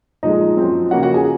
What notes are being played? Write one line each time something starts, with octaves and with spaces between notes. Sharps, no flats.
A#2 F3 G#3 D#4 D#5
F#2 F3 C4
C#3 F3 A#3 C#4 F#4 F#5
F#4 F#5
G#4 G#5